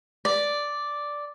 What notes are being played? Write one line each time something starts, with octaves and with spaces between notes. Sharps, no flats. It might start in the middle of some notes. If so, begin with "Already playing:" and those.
D5